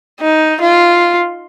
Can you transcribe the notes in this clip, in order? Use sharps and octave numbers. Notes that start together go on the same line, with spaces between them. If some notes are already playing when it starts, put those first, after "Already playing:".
D#4
F4